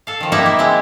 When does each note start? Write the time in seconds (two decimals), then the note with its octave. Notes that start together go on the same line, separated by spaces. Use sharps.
0.07 A4 F5
0.21 D#3 F3
0.32 A#3 D#4 E4 G4 E5 F#5
0.46 G4
0.59 G#3 C4 E4